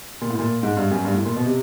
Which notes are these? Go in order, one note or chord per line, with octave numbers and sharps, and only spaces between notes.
A#2
A2
A#2
G#2
G2
F#2
G2
A2
A#2
B2
C3